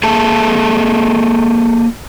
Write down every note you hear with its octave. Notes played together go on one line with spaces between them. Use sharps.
A#3 G#4 A4 E5 A5